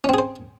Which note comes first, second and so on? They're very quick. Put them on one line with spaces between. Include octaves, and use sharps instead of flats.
C#4 C4 G#4 C5